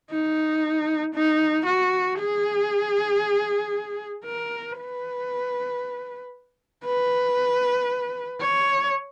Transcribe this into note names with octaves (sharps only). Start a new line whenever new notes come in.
D#4
D#4
F#4
G#4
A#4
B4
B4
C#5